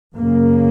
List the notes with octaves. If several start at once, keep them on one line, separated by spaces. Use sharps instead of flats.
F#2 C#3 A#3